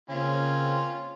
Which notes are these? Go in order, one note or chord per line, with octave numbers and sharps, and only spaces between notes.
C#3 A#3 C4 C#4 F4